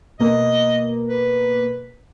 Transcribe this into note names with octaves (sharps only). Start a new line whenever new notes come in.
B2 A#3 D#5
B4